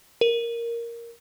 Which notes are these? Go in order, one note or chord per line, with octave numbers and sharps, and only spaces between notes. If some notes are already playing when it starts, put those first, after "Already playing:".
A#4